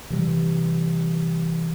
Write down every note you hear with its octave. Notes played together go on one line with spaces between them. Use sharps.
C3 E3 G3